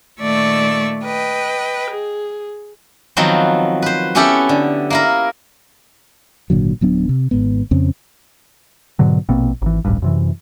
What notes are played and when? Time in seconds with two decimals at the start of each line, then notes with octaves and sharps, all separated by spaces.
0.21 A#2 D#3 A3 D5 C#6 E6
1.03 B4 D#5 G5
1.90 G#4
3.17 D#3 F3 F#3 B3 C4
3.82 B4 C5
4.15 B3 C#4 E4 G4 A4 F#5
4.49 D3
4.90 A#3 E4 A#4
6.50 G#1 A#2 D3 F#3
6.81 D1 F#3 B3 D4
7.09 C3
7.31 G#1 G#2 B3
7.71 F2 C#3 C4 C#4
8.99 G#2 B2 D3 F#3
9.29 A#1 B2 A#3 C4
9.62 G#1 E3
9.85 D1 A1 G2
10.02 F#2 C3 E3